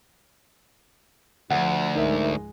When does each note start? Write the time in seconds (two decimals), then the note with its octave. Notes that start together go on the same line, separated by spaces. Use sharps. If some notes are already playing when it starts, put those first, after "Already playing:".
1.50 D2 F3 F#5
1.95 C#2 G#2 G#3 D#4 A#4 E5